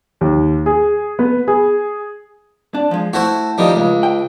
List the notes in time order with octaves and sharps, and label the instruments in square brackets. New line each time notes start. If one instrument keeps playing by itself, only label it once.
[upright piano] D#2
G#4
B3
G#4
[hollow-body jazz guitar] D4
F3 G#3
[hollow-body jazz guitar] A3 E4 [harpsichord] F#4 C5
[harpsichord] F2 D#3 G3
C#2
[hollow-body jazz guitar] G5